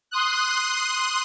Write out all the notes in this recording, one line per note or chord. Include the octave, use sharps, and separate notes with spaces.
C6 D#6 F#6